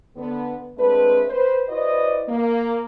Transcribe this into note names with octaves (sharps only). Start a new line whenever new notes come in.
D3 B3
G#3 A3 C4 D4 B4
B4 C5
E4 F#4 B4 C5 D5 D#5
A#3